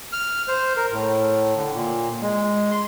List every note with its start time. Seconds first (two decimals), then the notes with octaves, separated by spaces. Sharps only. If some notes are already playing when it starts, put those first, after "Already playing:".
0.13 F6
0.48 C5
0.76 A#4
0.91 A2
1.56 D3
1.73 A#2
2.22 G#3
2.71 C6